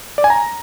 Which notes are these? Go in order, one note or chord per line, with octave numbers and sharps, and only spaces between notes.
D5
G#5
A#5